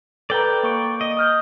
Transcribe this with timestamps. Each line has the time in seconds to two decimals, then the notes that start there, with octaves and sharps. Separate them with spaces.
0.30 A4 B4 D5 G5 A#5
0.63 A#3 C#6 D7
1.01 D#5
1.17 D#6 F6 G6